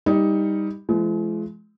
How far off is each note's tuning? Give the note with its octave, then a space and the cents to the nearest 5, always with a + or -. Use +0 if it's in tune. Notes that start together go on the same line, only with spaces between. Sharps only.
G3 +15 D#4 +15
F3 -45 G#3 +35